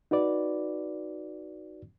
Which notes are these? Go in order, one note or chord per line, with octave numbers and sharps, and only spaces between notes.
D#4 F#4 B4 D5